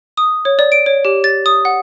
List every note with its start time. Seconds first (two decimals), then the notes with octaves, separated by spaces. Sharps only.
0.17 D#6
0.45 C#5
0.59 D5
0.72 D7
0.86 C#5
1.05 G4
1.24 A6
1.46 D#6
1.65 F#5